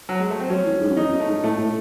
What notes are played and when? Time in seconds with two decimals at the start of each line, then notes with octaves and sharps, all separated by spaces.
0.09 F#3
0.19 G#3
0.30 A3
0.40 C4
0.50 F#3 C#4
0.66 E3
0.81 G#2
0.89 F#2
0.96 E2 D#4
1.13 F#2
1.20 A3
1.27 G#2
1.44 A2 A3
1.58 A2